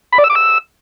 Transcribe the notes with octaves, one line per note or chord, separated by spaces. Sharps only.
B5
D5
E6
D6
E6